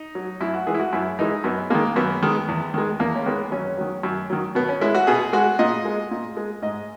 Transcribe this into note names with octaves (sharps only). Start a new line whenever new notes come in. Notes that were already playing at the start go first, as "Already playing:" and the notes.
Already playing: D#4
F#3
F#2 E4
F#4
E3 G#3 G#4
E4
F#4
F#2 E4
E3 G#3 D#4
F#2 B3
D#3 G#3 A#3
F#2 B3
D#3 G#3
E2
D#3 G#3
E2 A#3
C#4
D#3 G#3 B3
F#2 C#4
D#3 F#3
F#2
D#3 F#3
B2 B3
C#4
G#3 E4
F#4
B2 G#4
G#3 F#4
A#2 D#5
G#3
A#2
G#3
G#2 D#5